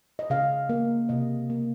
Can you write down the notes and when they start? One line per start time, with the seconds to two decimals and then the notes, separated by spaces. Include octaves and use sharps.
0.19 D#5
0.30 C#3 F5
0.69 A#3
1.09 C3 D#5
1.50 A#3